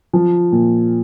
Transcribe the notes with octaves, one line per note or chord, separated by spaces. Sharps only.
F3
A#2